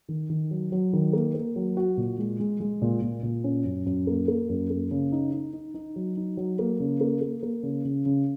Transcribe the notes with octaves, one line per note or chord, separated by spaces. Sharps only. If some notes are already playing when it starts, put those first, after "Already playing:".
D#3
D#3
F#3
F#3
D#3
A#3
A#3
F#3
F#4
A#2
G#3
G#3
G#3
A#2
A#2
A#2
C#4
F#2
F#2
A#3
A#3
F#2
A#3
C#3
D#4
D#4
D#4
D#4
F#3
D#4
F#3
A#3
C#3
A#3
A#3
A#3
C#3
C#3
C#3